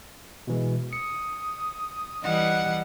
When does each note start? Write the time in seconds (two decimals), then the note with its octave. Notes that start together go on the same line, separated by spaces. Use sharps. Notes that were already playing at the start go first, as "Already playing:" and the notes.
0.47 B2 E3 G#3
0.93 D#6 C#7
2.24 E3 G3 D#5 F#5